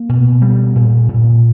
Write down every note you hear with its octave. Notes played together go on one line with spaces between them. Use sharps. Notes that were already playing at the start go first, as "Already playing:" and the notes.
Already playing: A#3
B2
G3
A#2
A#2